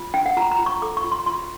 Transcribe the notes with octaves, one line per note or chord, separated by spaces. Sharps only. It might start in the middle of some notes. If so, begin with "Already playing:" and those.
Already playing: F4
D4 G5
F#5
F4 A#5
A#5
F4
C#6
A4 D6
C#6
F4
C6
F4 C6